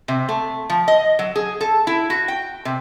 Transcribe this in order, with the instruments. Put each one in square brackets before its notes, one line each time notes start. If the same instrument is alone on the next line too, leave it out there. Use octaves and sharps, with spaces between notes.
[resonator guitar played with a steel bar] C3
A3
F3
D#5
F#3
G#4
A4
E4
F#4
G5
C3